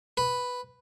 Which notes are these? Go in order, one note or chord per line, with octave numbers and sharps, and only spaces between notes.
B4